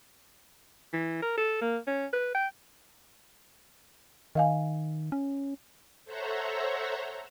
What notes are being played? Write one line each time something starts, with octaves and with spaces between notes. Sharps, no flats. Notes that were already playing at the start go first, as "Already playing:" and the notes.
E3
A#4
A4
A#3
C#4
B4
G5
D#3 D#5 F5 G#5
C#4
A4 C5 C#5 E5 F#5 A#5